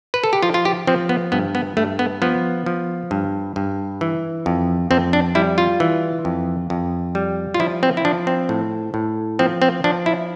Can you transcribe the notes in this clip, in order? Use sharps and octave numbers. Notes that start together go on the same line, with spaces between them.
B4
A4
G4
F3 F4
F4
G4
F3 C4
B3
G2 B3
B3
G2 A3
B3
F3 B3
F3
G2
G2
E3
F2
F2 C4
D4
G3 E4
F4
E3
F2
F2
G3
F4
F3 E4
C4
E4
F3 D4
C4
A2
A2
F3 C4
C4
F3 D4
E4